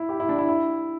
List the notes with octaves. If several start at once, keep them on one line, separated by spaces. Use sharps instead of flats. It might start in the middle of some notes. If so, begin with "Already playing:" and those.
Already playing: E4
G4
E4
D4
E4
E4